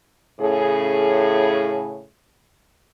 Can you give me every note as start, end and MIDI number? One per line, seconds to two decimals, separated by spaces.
0.40 2.04 45
0.40 2.04 49
0.40 2.04 68